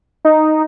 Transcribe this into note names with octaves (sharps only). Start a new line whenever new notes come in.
D#4